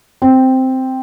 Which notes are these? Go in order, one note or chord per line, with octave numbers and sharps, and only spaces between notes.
C4